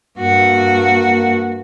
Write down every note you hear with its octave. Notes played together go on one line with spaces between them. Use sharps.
G2 A#3 F#4